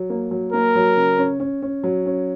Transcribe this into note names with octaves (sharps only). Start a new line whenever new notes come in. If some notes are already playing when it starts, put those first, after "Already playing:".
Already playing: F#3
A#3
F#3
A#3 A#4
F#3
C#3
C#4
C#4
C#4
F#3
C#4